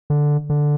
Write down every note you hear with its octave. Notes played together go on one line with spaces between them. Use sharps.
D3
D3